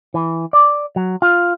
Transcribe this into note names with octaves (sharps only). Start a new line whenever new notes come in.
E3
D5
F#3
F4